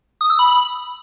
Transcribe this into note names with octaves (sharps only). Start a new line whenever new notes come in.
D#6
E6
B5